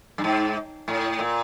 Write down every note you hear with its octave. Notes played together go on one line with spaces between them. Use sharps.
G2
G#2
A2
A#2